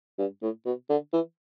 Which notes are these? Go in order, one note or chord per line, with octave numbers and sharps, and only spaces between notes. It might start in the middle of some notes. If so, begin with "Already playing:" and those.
G2
A2
B2
D3
E3